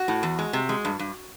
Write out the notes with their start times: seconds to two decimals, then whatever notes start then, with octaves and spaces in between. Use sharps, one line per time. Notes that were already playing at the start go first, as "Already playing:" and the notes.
Already playing: F#4
0.08 A2
0.23 E2
0.39 G#3
0.53 C3
0.69 G#3
0.85 G2
0.99 G2